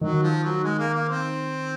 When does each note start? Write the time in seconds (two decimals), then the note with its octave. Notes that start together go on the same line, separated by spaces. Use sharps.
0.01 D#3 F#3
0.22 F3
0.43 F#3
0.63 G#3
0.78 A#3
0.94 A#3
1.09 C4